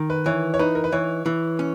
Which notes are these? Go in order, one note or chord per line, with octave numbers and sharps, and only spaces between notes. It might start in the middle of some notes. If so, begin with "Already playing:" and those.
Already playing: D#3
B4
E3 C#5
C#5
D#4 B4
A#4
B4
E3 C#5
E3
C#4